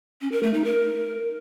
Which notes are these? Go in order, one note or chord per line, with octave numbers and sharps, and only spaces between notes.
C#4
A#4
A3
D#4
A#4